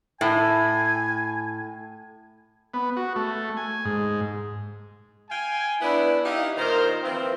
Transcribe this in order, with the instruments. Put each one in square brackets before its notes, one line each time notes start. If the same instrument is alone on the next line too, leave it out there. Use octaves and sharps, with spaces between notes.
[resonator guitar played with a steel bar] A2 [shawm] G#5
[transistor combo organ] B3
F#4
A3
G#5
G#2
[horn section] F5 G5 G#5
B3 D4 E4
D#4 E4 G4 F5
A#2 D#3 A#4 C5 A#5
E3 F3 C4